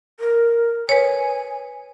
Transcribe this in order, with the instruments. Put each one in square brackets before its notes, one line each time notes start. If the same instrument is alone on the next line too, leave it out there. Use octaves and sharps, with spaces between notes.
[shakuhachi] A#4
[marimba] B4 C#5 [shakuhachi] G#5